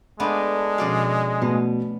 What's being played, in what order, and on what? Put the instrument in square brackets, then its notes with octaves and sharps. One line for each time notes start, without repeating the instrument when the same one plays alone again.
[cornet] G#3 [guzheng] A3 B3 D4 [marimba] B5 D6
[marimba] B2 F3 F#4 [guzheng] C#4 D5 F5
[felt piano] B2 [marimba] A3 B4 [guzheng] B3